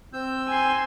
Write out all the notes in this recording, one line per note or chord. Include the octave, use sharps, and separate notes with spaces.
C4 E6 G6
G#5 C6